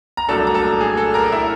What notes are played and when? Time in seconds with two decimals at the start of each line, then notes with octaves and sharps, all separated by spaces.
0.17 A#5
0.29 C2 A#2 F#3 A3 D4 A4 A5
0.47 A#5
0.54 A4 A5
0.81 G#4 G#5
0.97 A4 A5
1.14 A#4 A#5
1.32 E4 E5